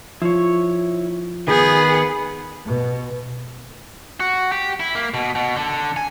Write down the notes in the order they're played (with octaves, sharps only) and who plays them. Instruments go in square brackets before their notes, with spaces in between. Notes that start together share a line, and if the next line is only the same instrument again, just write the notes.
[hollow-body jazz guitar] F3 [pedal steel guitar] E4 C#5
[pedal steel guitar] D#3 G6 [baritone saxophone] B3 [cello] G#4
[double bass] B2
[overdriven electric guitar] F#4
G4
E4
A#3
B2
B2
D3
G#5